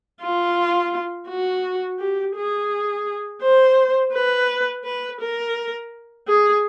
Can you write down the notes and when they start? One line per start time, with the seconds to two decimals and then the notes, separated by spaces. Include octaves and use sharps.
0.22 F4
1.28 F#4
1.99 G4
2.36 G#4
3.42 C5
4.14 B4
4.85 B4
5.21 A#4
6.27 G#4